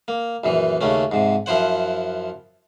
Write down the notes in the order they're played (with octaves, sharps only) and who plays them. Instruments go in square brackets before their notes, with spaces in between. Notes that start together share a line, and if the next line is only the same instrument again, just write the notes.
[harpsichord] A#3
A#1 F#2 E3
D#2 C#3 A3 C#4
G#2 C3
F#2 F3 E4 C5 F#5